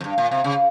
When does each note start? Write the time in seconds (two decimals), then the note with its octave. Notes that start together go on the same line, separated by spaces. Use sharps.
0.01 F2
0.04 G2
0.18 A#2
0.31 C3
0.44 C#3